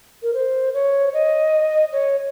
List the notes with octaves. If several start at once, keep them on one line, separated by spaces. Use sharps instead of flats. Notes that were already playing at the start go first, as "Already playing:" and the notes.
A#4
C5
C#5
D#5
C#5